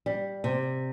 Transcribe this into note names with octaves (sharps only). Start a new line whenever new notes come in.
G3
C3